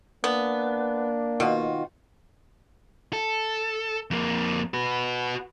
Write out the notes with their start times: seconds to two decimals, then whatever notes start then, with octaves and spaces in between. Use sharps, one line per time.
0.24 A#3 B3 D4
1.40 B2 D#3 F4 F#4
3.13 A4
4.11 F2 A#3
4.74 F#4 B4